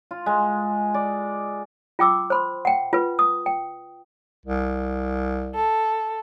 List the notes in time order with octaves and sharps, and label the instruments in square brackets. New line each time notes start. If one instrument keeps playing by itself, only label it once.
[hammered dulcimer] F4
G#3
D5
[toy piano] F4 G5 D6 E6
C5 B5 C6
F#5 G5
F4 B4
D#6
G5
[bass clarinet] C2
[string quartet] A4